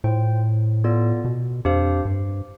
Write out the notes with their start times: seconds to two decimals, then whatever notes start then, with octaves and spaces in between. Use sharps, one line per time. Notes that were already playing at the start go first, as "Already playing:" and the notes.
0.04 A2 F4 C5 G5
0.84 B3 F4 A4 D5
1.25 B2
1.65 F2 D4 G4 C5 F5
2.05 G2